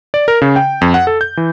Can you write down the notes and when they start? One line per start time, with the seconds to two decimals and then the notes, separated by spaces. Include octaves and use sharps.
0.14 D5
0.28 A#4
0.42 C#3
0.56 G5
0.81 F2
0.94 F#5
1.07 A4
1.21 G6
1.37 E3